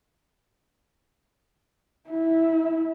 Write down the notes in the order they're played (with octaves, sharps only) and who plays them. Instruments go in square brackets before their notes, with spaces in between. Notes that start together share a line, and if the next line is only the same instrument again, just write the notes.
[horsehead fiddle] E4